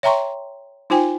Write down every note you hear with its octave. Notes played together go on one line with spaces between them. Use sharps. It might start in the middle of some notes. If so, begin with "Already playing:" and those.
C#5 E5 G5 A#5 C6 C#6
D#4 F4 C5 G5 G#5